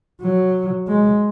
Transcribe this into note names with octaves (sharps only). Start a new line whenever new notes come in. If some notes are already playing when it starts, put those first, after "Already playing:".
F#3
G#3